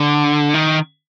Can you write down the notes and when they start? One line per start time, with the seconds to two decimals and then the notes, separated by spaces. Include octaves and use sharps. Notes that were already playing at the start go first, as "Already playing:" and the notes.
Already playing: D3
0.54 D#3